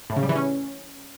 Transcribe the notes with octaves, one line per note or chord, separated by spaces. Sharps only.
A2
C#3
G3
E3
C#4